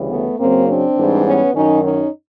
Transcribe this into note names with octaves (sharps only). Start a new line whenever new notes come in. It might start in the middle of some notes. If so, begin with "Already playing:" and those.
Already playing: D2 C#3 E3 G3
A3 B3
F#2 C#3 F#3 A#3 C4
C4 D4
G#2 E3 G3
B3 C#4
F#2 D#3 F#3 C#4 D#4
C#4 D#4